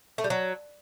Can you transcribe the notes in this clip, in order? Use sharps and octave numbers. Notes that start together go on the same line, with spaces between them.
A3
G3
F#3